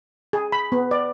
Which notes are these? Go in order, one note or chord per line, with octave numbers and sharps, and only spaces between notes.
G#4
B5
B3
D5